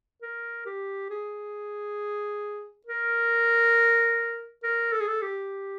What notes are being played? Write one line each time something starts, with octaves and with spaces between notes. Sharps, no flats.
A#4
G4
G#4
A#4
A#4
A4
G#4
A4
G4